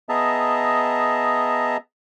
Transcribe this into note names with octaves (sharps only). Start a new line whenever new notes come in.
B3 G#4 D#5 E5 A5 A#5